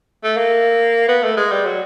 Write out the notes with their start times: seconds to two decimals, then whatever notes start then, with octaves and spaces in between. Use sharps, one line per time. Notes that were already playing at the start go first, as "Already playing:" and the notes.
0.24 A3
0.37 A#3
1.08 B3
1.24 A3
1.37 G#3
1.51 G3
1.65 F#3